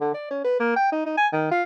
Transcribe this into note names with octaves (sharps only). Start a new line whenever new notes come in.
D3
D5
C#4
B4
A#3
G5
D#4
D#4
G#5
D#3
F4